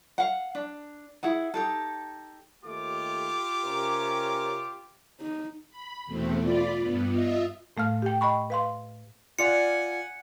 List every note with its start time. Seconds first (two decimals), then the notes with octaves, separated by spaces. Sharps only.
0.18 F5 F#5
0.55 D4
1.23 E4 G#4 F#5
1.54 D#4 G4 A4
2.64 D#2 A3 F4 G4 D6
3.63 C3 C#4 A#4
5.20 D#4
5.70 B5
6.06 E2 B2 A3 C4
6.40 F4 D5 B5
6.80 G2 B3
7.10 F4 D#5 E5
7.77 A2 A3 F5 F6
8.02 G4 G5
8.21 D#5 G5 B5 C#6
8.50 B4 F5 C6
9.39 F4 D5 F5 F#5 G#5 C#7